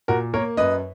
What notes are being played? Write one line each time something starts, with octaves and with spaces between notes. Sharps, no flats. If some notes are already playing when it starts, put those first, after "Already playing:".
A#2 F#4 A#4
A#3 A#4 C#5
F#2 B4 D#5